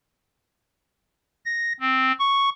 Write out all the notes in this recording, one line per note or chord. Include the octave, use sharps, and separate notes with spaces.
A#6
C4
C#6